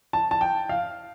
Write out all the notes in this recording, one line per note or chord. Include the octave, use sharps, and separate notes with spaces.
A5
A5
G5
F5